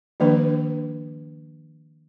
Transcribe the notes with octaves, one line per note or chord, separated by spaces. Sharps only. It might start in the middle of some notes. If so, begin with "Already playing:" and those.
D#3 F3 A#3 D4 B4